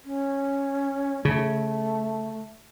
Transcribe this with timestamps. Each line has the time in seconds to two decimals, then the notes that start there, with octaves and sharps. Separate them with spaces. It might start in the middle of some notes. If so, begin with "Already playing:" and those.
0.05 C#4
1.25 C#3 A3